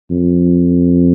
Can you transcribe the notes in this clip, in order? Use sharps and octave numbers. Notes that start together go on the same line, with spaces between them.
F2